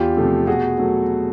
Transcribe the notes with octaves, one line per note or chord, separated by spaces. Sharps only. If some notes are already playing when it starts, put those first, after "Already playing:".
Already playing: E2 F4 G4
C3 F3 A3
B2 F#4 G#4
F#3 A3